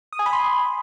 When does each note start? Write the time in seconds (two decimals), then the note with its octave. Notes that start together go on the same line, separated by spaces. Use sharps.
0.13 D#6
0.19 G#5
0.26 B5
0.33 C6